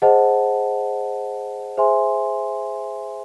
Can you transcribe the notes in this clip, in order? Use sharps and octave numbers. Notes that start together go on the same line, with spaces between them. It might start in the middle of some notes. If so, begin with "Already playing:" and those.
G#4 C5 D#5 F#5 A5
G#4 C5 E5 G#5 C6